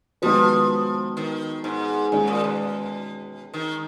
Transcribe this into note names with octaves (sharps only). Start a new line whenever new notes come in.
D#3 F3 G#3 B3 F#4 B4
D#3
G#2
G#2 D#3 G#3 C#4 G#4
A#2
B2
D#3